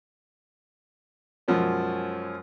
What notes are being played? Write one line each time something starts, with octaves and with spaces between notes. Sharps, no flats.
F#2 B2 F3 G#3 C#4